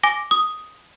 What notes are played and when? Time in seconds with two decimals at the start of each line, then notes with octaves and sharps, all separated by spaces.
0.03 G#5 D6 A#6
0.31 D#6